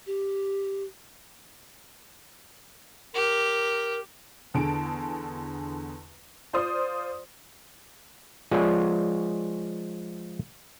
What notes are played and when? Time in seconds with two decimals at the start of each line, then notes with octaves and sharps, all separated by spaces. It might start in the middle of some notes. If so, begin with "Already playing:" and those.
0.06 G4
3.14 G4 A#4
4.54 E2 D3 G#4 A5 D7
6.53 F4 C5 D5 C6 D#6
8.51 F3 G#3 F4 G#4 C#5 D5